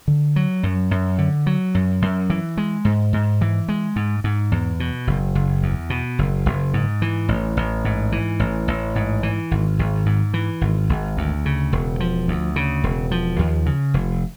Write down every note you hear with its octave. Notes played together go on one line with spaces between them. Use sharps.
D3
F#3
F#2
F#2
D3
F#3
F#2
F#2
E3
G#3
G#2
G#2
E3
G#3
G#2
G#2
E2
B2
F#1
F#1
E2
B2
F#1
F#1
G#2
E3
A1
A1
G#2
E3
A1
A1
G#2
E3
G#1
G#1
G#2
E3
G#1
G#1
D2
C#3
E1
F3
D2
C#3
E1
F3
D#2
C#3
F1